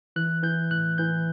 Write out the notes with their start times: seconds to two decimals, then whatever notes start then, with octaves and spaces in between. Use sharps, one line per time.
0.16 E3 F#6
0.43 E3 G6
0.71 A2 F#6
0.98 E3 G6